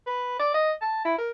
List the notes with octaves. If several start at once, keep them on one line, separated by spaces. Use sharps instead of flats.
B4
D5
D#5
A5
E4
A#4